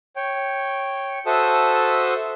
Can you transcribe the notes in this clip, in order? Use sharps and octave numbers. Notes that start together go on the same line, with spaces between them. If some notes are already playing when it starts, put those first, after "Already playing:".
C#5 G5
F#4 A4 C5 E5 A5 D#6